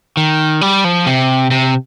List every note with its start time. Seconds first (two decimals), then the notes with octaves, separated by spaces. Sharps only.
0.17 D#3
0.61 G3
0.84 F3
1.06 C3
1.51 C3